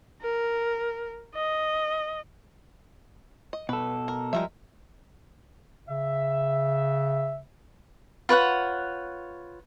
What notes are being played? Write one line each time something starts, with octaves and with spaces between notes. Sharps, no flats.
A#4
D#5
D#5
B2 A4 B4
A#4
F3 G3 G#3 A#4 E5
C#3 E5
F4 B4 C#5 F#5